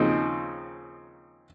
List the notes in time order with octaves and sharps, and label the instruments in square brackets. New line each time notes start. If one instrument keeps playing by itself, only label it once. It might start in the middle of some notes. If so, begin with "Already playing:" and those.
Already playing: [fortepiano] D#2 C#3 F3 C4 D#4